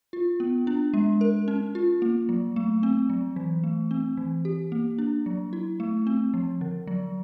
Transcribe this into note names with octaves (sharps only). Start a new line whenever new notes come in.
F4
B3
D4
G#3
A#4
C#4
F4
A#3
F#3
A3
C4
F#3
E3
A3
C4
E3
G4
A#3
D4
F#3
E4
A3
C4
F3
D3
F#3